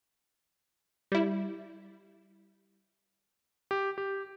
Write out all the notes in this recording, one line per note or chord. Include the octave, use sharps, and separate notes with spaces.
G3 E4
G4
G4